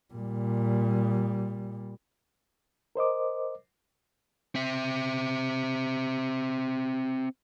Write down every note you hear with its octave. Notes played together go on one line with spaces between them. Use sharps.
A#2 G3
A#4 C5 D#5 D6
C4 E5